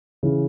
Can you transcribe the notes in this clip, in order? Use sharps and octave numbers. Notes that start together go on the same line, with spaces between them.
C#3 E3